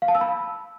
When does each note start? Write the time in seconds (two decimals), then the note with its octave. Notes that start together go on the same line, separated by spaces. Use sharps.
0.02 F5
0.08 A5
0.15 E6
0.21 B5